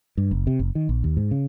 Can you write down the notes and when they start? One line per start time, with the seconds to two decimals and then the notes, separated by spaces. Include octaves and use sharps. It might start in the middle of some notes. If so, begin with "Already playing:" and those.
0.17 G2
0.31 F#1
0.47 C3
0.59 F#1
0.75 D#3
0.89 A#1
1.04 D#2
1.17 G#2
1.31 C#3